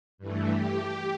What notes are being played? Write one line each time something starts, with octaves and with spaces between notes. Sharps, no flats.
G2 E3 A3
G4